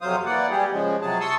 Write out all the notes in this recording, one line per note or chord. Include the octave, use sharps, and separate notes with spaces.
F2 C3 F#3 C5 F5 D#6
E3 A#3 D5 F#5
G3 G4 G#4
C#3 F3 G#3
C3 F#3 G#4 A5
A5 C6 C#6 D#6 E6